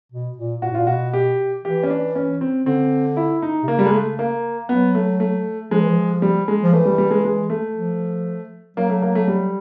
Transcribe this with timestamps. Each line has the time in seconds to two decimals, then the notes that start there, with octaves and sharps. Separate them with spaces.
0.12 B2
0.37 A#2
0.62 A#2 F#4
0.70 A2
0.75 A#2 F4
0.87 B2 F#4
1.13 G4
1.64 E3 G4
1.83 C#4
1.90 D4
2.15 C#4
2.41 C4
2.66 D3 C4
3.17 E4
3.42 D#4
3.63 C3
3.68 C#3 A#3
3.79 G3
3.86 G#3
3.93 A3
4.19 A#3
4.69 F#3 B3
4.95 A3
5.20 A3
5.71 F3 G#3
5.80 E3
5.88 F3
6.22 G3
6.48 G#3
6.63 F3
6.73 E3 A3
6.86 G3
6.98 G3
7.11 G#3
7.25 G#3
7.50 A3
7.75 F3
8.77 F#3 A#3
8.90 A3
9.02 A#3
9.15 A3
9.28 G3